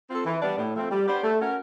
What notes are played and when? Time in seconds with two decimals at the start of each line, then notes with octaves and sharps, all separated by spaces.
0.09 C4 F4 A4
0.26 E3
0.41 G3 B3 D4
0.58 A2
0.75 F3 A3 C4
0.91 G3
1.07 B3 D4 G4 C5
1.24 A3
1.40 C#4 F#4 A#4